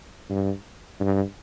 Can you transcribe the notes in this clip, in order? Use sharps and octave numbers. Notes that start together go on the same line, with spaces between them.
G2
G2